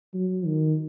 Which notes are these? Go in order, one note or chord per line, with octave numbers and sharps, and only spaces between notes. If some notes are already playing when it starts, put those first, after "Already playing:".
F#3
D#3